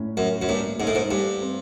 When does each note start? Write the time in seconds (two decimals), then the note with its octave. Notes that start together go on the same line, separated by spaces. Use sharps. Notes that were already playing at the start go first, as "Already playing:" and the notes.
Already playing: A2 C#4
0.17 F#2 C#4
0.42 F#2
0.48 G2 A#3
0.79 G#2 C#4
0.87 A2
0.95 G#2
1.11 G2 G4
1.42 C4